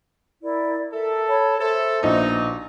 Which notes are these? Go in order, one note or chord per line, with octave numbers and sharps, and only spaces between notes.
E4 A#4 D5
A4 A#4 E5
C#5 A5 B5
A4 C5 E5
A#1 B2 D#4 D#5